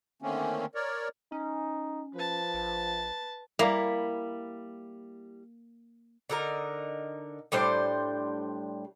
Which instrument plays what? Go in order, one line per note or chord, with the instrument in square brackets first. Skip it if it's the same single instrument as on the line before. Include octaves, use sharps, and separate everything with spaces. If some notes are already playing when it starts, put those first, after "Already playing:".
[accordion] D3 D#3 A3 A#3 C4 C#4
A#4 C#5 D5
[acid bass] C#4 [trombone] D#4
[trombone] F3 [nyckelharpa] B4 A5
[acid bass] A#1
[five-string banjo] G3 E4 [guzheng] A#3
[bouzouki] D3 D#4 A#4
A2 G3 D4 C5